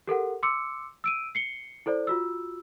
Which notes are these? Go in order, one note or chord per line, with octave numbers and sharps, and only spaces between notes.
G4 A4 A#4 F#5
C6 D6 E6 C#7
E6 D7 D#7
C7 C#7 G7
E4 A4 C5 D5
F4 F#4 E6